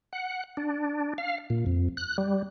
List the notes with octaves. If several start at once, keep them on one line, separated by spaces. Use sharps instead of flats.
F#5
D4
F5
A#2
F2
F#6
G3